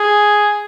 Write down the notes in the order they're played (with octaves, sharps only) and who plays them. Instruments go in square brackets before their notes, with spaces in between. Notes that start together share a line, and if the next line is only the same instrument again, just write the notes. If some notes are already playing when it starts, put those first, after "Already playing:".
Already playing: [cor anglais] G#4